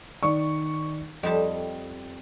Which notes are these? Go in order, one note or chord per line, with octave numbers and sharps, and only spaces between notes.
D#3 D5 C#6
F2 G3 D#5 A5